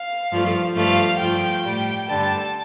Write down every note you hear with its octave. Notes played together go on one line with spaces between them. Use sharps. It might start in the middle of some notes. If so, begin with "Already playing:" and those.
Already playing: F5
G2 F3 A3
G2 F3 A3 F5
G2 F3 A3 G5
A2 G3
G2 D3 G3 A5